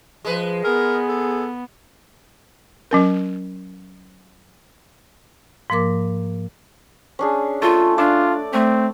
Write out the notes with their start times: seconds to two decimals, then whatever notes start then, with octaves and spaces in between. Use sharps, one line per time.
0.25 F3 G#3 B4
0.64 B3 G#4 A#4
1.08 A4
2.91 F#3 C#4 A#4
5.70 G#2 F3 A#3 A#4 D6
7.19 C#4 D4 G#4
7.62 A3 F4
7.98 D4 F4 D5
8.53 A3 C4